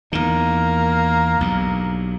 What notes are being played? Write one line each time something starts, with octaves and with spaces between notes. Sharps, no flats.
E2 D#3 A#3
B1 G2